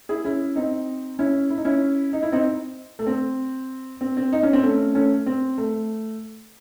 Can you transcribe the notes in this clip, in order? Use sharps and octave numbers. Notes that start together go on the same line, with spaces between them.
E4 G#4
C#4 E4
C4 D#4
C#4 E4
E4
D#4
C#4 E4
D#4
E4
C4 D#4
A3
C4
C4
C4
D#4
C#4
C4
A3 C#4
A3 C#4
C4
A3